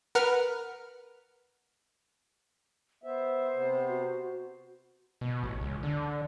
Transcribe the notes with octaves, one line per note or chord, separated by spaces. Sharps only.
A#4 B4 F#5 F6
B3 C5 E5
C3 B3
F#4
B2
A1
C#2
D3